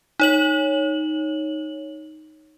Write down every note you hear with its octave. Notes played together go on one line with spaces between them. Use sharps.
D#4 C#5 F#7